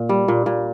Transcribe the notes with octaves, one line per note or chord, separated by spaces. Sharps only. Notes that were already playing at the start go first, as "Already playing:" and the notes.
Already playing: A#2
G3
A#2
A#2